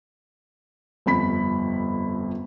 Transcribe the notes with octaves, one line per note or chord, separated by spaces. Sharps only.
G1 F2 B5 B6